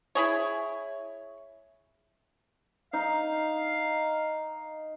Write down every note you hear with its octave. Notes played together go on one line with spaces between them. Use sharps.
E4 G#4 C#5
D#4 F5